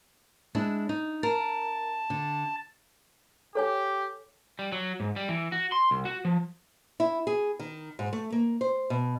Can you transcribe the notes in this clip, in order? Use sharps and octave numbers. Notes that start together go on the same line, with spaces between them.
G#3 D4 E4
D#4
A#4 A5
D3
G4 A4 C#5 G#5
G3
F#3
G#2
G3
E3
F#4
C6
C2
F#4
F3
E4
G#4
D#3
G#2
A3
A#3
C5
B2